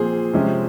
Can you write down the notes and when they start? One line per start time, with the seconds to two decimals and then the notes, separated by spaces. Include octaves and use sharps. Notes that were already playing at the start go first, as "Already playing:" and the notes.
Already playing: A#2 F3 C4 G#4 C5
0.33 C3 F3 G#3 C#4